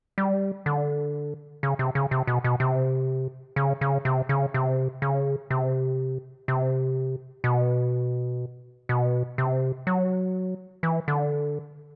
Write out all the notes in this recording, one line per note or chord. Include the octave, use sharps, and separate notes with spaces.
G3
D3
C#3
C3
C#3
C3
B2
B2
C3
C#3
C#3
C3
C#3
C3
C#3
C3
C3
B2
B2
C3
F#3
E3
D3